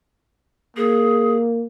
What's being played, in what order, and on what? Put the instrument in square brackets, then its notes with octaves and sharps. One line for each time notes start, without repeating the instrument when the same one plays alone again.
[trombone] A#3 [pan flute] G#4